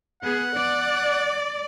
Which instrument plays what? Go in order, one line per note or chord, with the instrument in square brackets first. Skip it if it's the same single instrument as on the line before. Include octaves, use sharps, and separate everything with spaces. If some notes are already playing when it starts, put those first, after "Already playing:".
[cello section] B3 G#4 [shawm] F#5
[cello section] D5